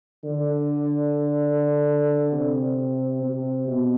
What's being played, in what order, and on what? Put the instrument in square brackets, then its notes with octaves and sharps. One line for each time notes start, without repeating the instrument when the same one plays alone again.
[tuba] D3
C3
C3
B2